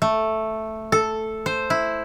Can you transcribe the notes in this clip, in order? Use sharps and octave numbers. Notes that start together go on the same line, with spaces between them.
A3
A4
C5
E4